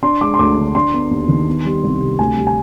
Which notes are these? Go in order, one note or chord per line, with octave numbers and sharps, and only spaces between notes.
D4 C6
G#3 D6
C6
D2 D6
D3
D4 C6
B3
D#2
D#3
B3
G3
C2
C3
D2 G#5
G3
G#5